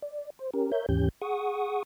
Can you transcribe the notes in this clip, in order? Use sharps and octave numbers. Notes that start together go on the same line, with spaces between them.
D5
C5
C#4 G4 A#4
A#4 C#5 E5 G6
D#2 G#2 E3 C#4 G4 G6
G#4 F#5 C#6 D#6